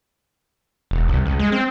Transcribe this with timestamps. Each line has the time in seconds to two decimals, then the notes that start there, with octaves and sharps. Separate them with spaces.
0.91 E1
1.08 C2
1.26 C#2
1.39 G#3
1.52 C4